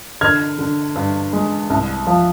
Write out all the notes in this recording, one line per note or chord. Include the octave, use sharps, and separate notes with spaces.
D3 F6 G#6
D3
G2
G#3
C2
F3